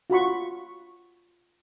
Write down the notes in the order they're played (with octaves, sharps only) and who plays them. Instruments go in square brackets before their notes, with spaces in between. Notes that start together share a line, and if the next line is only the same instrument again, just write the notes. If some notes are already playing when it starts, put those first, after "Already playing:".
[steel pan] F4 F#4 B5 C#6